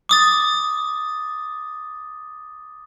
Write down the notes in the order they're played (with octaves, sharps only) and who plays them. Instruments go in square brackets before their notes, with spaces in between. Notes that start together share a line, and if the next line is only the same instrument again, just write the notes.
[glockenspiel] D6 D#6 A6